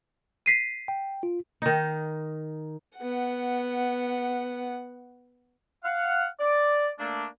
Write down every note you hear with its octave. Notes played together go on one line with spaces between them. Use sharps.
B6 C7 D#7
G5
F4
D#3 D#4
B3 F#5
F5 F#5
D5
A3 A#3 D4